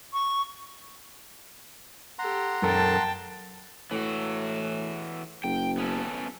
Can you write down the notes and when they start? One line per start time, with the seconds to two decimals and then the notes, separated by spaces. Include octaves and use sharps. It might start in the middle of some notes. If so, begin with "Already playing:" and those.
0.13 C#6
2.19 G4 A4 F#5 A#5 C6
2.63 F#2 A4 A#4 G5 A5
3.91 A2 E3 F#4
5.44 F#1 G5
5.78 B3 C#4 A4